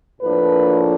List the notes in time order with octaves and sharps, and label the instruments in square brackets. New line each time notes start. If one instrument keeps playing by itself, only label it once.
[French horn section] A2 F3 A#3 D4 B4